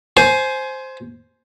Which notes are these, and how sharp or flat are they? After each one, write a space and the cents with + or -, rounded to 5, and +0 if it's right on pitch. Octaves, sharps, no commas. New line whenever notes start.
C5 +0 G#5 +25